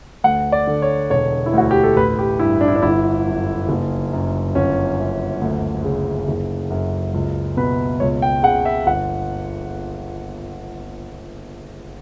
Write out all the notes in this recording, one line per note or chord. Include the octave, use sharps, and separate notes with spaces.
D2 F#5
D5
D3
C#5
E1 C#5
E4
D2 F#4
G4
A4
A1 B4
G4
G2 E4
D4
E4
D4
G1 E4
F#2
F#1
F#2
G1 C#4
F#2
D2
C#3
F#1
F#2
C#2
B2 B4
C#2 C#5
G5
C#3 F#5
E5
G1 F#5